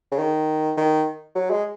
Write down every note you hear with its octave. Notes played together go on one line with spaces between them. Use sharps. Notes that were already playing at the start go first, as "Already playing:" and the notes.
C#3
D#3
D#3
F#3
G#3